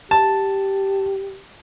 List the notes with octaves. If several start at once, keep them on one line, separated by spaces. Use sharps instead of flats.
G4 A5